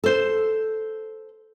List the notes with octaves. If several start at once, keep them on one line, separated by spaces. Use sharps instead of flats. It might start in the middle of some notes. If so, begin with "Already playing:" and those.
A4 C5